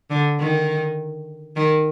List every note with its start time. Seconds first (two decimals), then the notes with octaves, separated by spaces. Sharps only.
0.10 D3
0.40 D#3
1.56 D#3